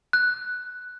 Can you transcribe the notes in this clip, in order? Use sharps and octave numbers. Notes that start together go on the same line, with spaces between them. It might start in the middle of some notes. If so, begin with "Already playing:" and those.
F#6